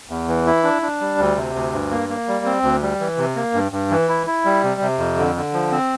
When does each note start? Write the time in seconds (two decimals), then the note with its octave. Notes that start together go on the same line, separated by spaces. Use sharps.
0.10 E2
0.28 E3
0.47 E4
0.64 D4
0.82 D4
1.01 G3
1.18 D2
1.36 C3
1.55 D2
1.72 G2
1.91 A#3
2.09 A#3
2.28 G3
2.45 C4
2.63 D2
2.82 G3
3.00 E3
3.18 C3
3.36 A#3
3.54 G2
3.72 G2
3.90 E3
4.09 E4
4.27 E4
4.45 G3
4.63 C3
4.81 C3
4.99 F2
5.17 D3
5.36 D3
5.53 F3
5.72 C4